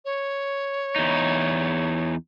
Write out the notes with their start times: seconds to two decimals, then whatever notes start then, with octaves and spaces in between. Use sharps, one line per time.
0.05 C#5
0.96 E2 D#4